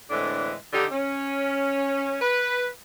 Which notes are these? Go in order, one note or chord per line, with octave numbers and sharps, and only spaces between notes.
A2 D3 E3 G#3 C4 D4
D3 D#4 G4
C#4
B4